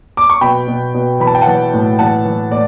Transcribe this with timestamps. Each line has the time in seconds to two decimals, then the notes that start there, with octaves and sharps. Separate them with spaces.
0.17 D6
0.30 C#6
0.41 B2 G5 B5
0.68 B2
0.95 B2
1.20 E3 B5
1.27 A5
1.35 G5
1.41 F#5 A5
1.47 E3
1.74 A2
1.99 E3 F#5 A5
2.25 E3
2.52 A2 D5